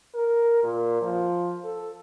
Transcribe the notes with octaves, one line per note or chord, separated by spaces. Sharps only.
A#4
A#2
F3
A4